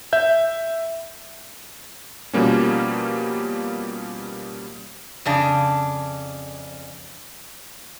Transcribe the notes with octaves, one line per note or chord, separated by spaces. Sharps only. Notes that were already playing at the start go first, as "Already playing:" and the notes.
E5 G6
B2 F3 G3 A#3 C#4
F2 C#3 D4